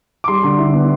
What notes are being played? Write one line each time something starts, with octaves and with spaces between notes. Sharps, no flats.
D6
G3 C6
D3
E4
B3